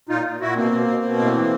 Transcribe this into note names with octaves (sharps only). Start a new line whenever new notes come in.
A#2 D#4 F4
A#2
A#2 E4 F#4
B2 A#3 C4
B2
B2
B2
A2
E3